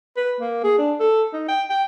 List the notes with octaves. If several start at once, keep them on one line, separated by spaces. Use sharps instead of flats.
B4
A#3
G#4
D4
A4
D#4
G5
G5